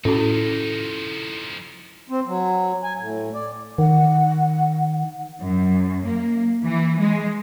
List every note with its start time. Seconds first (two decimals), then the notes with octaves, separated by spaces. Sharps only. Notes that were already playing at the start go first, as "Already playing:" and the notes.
0.05 A2 F3 C#4 D#4 E4 F#4 A4
2.10 C4
2.27 F#3
2.83 G#5
2.99 A2
3.34 D5
3.78 D#3 F#5
5.41 F#2
6.03 A#3
6.64 E3
7.00 G#3